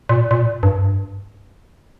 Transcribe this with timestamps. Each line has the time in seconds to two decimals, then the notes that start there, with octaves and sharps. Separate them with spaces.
0.09 A#2
0.31 A#2
0.63 G2